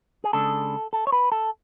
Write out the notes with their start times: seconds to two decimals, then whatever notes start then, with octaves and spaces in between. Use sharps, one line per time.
0.24 G#4
0.33 C#3 G#3 D4 A4
0.93 A4
1.07 C#5
1.12 B4
1.32 A4